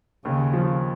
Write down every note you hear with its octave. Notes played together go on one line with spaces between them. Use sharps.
D#2 C#3
F3